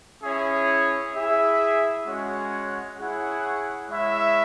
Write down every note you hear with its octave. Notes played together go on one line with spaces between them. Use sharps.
C#4 E4 G#4 C#5 E5
E4 G#4 E5
G#3 C#4 F#4 C#5 F#5
E4 G#4 C#5 F#5
G#3 E4 C#5 E5